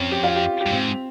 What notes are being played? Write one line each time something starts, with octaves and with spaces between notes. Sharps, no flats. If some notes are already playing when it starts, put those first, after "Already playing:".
Already playing: F2 C4 C#4
G4
F4
G4
G4
G2
G#2 C4